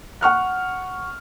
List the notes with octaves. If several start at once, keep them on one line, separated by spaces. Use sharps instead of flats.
F#5 C#6 F6 F#6